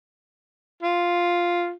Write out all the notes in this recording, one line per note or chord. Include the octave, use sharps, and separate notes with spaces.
F4